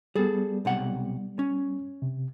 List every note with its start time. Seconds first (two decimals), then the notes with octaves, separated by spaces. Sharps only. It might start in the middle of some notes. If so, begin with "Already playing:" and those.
0.16 G3 B3 G#4 A4
0.65 B1 C3 F#5
1.39 C#4
2.02 C3